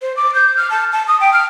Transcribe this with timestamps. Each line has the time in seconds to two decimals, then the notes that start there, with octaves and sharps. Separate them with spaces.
0.02 C5
0.17 D6
0.35 G6
0.57 F6
0.70 A5
0.93 A5
1.08 D#6
1.21 G5
1.33 F6